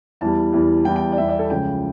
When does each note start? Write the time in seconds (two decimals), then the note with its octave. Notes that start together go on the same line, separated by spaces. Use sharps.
0.21 E2 E3 G3 A5
0.53 E2 E3 G3
0.85 E2 E3 G3 G5
0.96 G5
1.12 D5
1.18 E2 E3 G3 E5
1.29 D5
1.39 A4
1.50 C#2 C#3 F3 G5